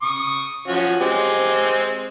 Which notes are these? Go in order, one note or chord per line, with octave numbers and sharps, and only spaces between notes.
C#6 D#6
F3 C#4 F#4
G#3 C4 G4